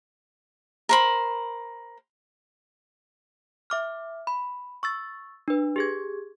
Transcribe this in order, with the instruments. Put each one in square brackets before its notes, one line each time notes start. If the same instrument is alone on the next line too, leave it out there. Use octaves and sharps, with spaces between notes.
[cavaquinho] A#4 C5 B5
[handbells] E5 D6 F6
B5
C#6 E6 A6
D4 B4
G4 G#4 G#6